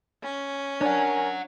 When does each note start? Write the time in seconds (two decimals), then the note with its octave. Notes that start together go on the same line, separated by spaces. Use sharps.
0.23 C#4
0.81 D4 A#4 C#5 F#5 G#5